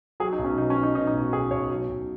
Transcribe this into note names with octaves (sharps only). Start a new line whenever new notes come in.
F#3 G#4
D#4
B1
C#4
B2 D#4
C#4
F#3
D#4
B2 D#4
D#4
B1
F#4
B1 G#4
B1 C#5
F#3
B1